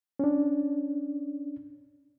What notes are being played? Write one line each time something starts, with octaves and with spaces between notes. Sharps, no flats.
C#4 D4